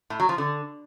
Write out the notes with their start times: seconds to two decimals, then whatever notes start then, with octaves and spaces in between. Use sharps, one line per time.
0.10 A2
0.20 F#3
0.29 F3
0.38 D3